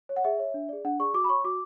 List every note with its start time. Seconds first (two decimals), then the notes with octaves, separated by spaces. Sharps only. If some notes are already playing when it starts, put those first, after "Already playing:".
0.09 C#5
0.16 F#5
0.24 G#4 E5
0.39 C#5
0.54 D4
0.69 G#4 D5
0.85 D4 F#5
1.00 G#4 D5 C#6
1.14 F#4 D6
1.24 B5
1.29 C#5 C#6
1.44 F#4 D6